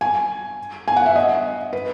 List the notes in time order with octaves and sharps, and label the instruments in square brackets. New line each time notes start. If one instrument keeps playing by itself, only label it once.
[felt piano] G#5
G#5
F#5
E5
D#5
B4